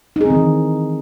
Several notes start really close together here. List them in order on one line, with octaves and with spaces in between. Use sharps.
D#4 G#4 C4 D#3 E3